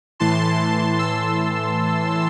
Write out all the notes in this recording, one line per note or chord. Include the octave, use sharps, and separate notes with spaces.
A2 E3 A5 C6
C6 E6